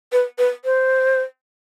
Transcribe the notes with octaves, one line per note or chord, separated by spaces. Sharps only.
B4
B4
C5